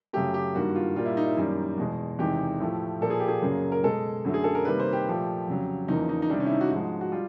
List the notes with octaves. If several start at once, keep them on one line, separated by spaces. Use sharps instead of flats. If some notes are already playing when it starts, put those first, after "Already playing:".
F#2 C#3 F#3 A3 G4
G4
G2 D#3 G3 A#3 F#4
F4
A#2 G3 A#3 F4
E4
D#4
E4
F#2 D#3 G3 A#3
E2 B2 G#3
E2 C3 D#3 G#3 G4
A2 F3 A3
A#2 F3 A#3 A4
G#4
G4
G#4
F#2 C#3 F#3 A#3
A#4
B2 G#3 A4
F#2 D3 F#3 A3
G#4
A4
A#4
C3 D#3 G3 A#3 B4
C5
G4
A#2 F3 A3
F2 C#3 F#3
E2 C#3 F3 A#3 D#4
D#4
D#4
C3 D#3 G3 D4
C#4
E4
D#4
F#4
G#2 F3 G#3 F#4
F#4
G3 F4